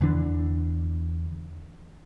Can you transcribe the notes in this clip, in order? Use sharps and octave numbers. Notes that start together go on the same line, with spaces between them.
E2 D3 E3 D4